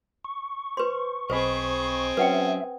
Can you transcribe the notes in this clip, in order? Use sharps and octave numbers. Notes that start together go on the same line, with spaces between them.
C#6
B4 C5 C6
B1 C4 G#4 C5 D#5 B5
F#3 C#4 B4 E5 F#5 G5